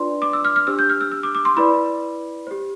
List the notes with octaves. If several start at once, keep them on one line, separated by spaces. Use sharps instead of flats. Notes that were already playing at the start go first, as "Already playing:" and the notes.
Already playing: D4 F4 B4 D5 C6
D6
E6
F6
F6
D4 G4 C5 E6
G6
F6
E6
E6
D6
D6
C6
E4 B4 D5 B5
G4 C5